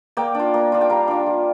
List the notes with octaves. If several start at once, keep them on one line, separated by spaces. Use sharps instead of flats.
A#3 D5 G5
D4 F4
A#3
D4 F4
G5
G3 F5 A#5
D4 F4
G3